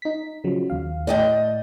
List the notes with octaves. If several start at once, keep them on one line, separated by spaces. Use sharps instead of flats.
D#4 B6
C#3 F3 F#3
D#2 F5
A2 D5 D#5 G5 A5